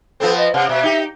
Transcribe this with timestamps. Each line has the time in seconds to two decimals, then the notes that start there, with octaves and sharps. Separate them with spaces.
0.20 F3 B3 C4 A4
0.37 D#5
0.54 C3 F#5
0.69 B2 E5
0.83 D#4 G4